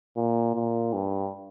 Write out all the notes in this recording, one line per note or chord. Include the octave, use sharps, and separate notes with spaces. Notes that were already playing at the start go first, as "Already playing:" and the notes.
A#2
A#2
G2